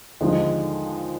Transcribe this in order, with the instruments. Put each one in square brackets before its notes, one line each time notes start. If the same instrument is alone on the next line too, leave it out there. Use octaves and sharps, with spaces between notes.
[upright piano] D#2 D3 F3 G#3 [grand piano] D#4